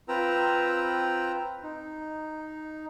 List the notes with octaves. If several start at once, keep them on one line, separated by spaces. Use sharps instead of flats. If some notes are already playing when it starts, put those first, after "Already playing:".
C4 F4 B4 G5 A#5 E6
D#4